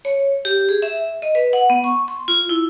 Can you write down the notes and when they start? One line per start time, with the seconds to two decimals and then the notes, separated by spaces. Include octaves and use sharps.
0.05 C#5
0.45 G4
0.69 G#4
0.82 E5
1.22 D#5
1.35 B4
1.53 F#5
1.70 B3
1.84 C#6
2.08 C6
2.28 F4
2.49 E4